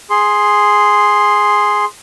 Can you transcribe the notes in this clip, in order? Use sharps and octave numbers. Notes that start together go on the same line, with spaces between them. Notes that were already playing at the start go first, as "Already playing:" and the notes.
G#4 C6